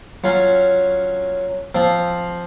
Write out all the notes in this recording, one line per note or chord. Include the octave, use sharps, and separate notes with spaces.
F#3 C#4 F4
F3 C4 F4